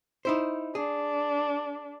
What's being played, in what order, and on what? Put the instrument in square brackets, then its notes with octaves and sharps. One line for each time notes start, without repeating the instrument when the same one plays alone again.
[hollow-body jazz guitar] D#4 E4 C5
[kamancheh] D4 [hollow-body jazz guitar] G#4